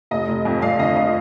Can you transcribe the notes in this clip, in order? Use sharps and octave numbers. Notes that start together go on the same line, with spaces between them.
F1 D#5
F1
F2
F2 D5 F5
D3 D#5
D#5